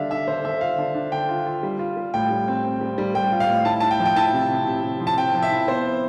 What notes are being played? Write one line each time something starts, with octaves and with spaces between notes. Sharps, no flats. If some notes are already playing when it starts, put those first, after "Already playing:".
Already playing: D3 G3 D4 E5 F5
D4 E5
D3 C5
D3 E5
F4 F5
D3
D4
D3 G5
F4
F4
G3
F4
G3
A2 G5
G3
C4
C4
G3
G3
G3 G5
F4
F5
A2
E4 A5
E4 A5
G5
F3
G5
E4 A5
C3
C4
C3
C3
F3
A5
C4 G5
F3
E5
E4
B3 C5